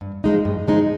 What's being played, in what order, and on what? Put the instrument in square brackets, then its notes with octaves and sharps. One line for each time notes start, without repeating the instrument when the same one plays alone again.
[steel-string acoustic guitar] G2
F3 G#3 D#4
G2
F3 G#3 D#4